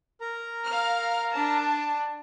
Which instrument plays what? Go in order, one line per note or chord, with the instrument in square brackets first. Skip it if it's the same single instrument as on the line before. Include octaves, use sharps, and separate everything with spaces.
[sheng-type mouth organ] A#4 A#5
[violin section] F5 F6
D4 A5